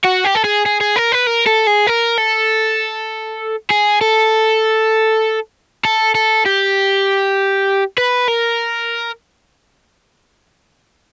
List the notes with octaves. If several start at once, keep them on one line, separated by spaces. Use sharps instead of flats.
F#4
G4
A4
G#4
G#4
G#4
A#4
B4
A#4
A4
G#4
A#4
A4
G#4
A4
A4
A4
G4
B4
A#4